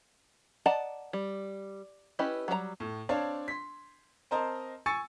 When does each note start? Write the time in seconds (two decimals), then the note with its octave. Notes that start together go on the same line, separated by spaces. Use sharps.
0.66 D5 D#5 F#5 A5 A#5
1.13 G3
2.19 C#4 E4 G4 B4 D#5
2.48 F#3 G3 A#4 A#5
2.80 A2
3.09 C4 D4 C#5 D5 F5 A5
3.48 C6 B6
4.31 C4 A#4 C5 D#5 A5 A#5
4.86 G#5 C#6 E6 A6 C#7